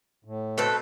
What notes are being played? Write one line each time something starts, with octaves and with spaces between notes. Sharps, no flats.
A2
B2 A3 C4 A4 B4